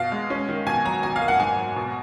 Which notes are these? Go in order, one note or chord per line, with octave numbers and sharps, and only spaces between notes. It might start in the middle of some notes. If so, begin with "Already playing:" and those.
Already playing: B2 F5
G#3
C#4
D#3
B2 G#5
F#3 A#5
B2 G#5
F5
A#3
F#5
G#2 G#5
F#3
B2